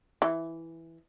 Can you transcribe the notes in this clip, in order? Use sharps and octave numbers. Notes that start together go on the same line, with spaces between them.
E3